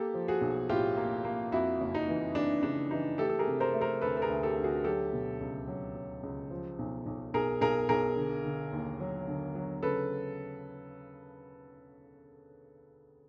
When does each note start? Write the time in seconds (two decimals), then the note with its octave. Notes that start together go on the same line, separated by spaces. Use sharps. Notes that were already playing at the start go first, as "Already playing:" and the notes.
Already playing: A#3 G4 A4
0.14 F3
0.28 F#4 G#4
0.41 B1
0.69 A2 F4 G4
0.97 A#3
1.25 A#3
1.52 F2 E4 F#4
1.81 F#1
1.95 D#4
2.08 E3
2.35 E3 D4
2.63 C#3 D4
2.91 E3 D#4
3.18 A3 G4 A4
3.29 A4
3.39 G#4 A#4
3.47 C3
3.60 A#4 C5
3.74 A3
3.81 A#4 C5
4.01 D2 A4 B4
4.17 A4
4.22 G#4 A#4
4.30 D2
4.43 G4 A4
4.57 D2
4.64 F#4 G#4
4.84 F#3 G4 A4
5.13 B2
5.40 C#2
5.68 F#3
5.95 F#3
6.23 C#2
6.50 F3
6.79 B1
7.06 B1
7.34 B1 G#4 A#4
7.61 B1 G#4 A#4
7.89 B1 G#4 A#4
8.16 D3
8.45 D3
8.72 D#2
9.00 F#3
9.28 D3
9.55 F#3
9.83 C#3 A4 B4